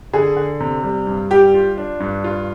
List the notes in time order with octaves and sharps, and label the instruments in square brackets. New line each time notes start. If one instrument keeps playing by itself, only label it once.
[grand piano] D3 [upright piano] G#4
[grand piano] D3
C3
G3
G2
[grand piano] G3 [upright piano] G4
[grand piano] F4
D4
G2
F4